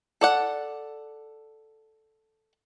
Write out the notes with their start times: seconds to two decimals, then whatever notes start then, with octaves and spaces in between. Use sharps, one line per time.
0.21 A4 D5 F#5